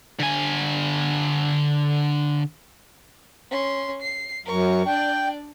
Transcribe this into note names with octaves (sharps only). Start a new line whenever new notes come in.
D3 G#5
C#4 C6
C7
F#2 A#4 C#6
D4 D5 G5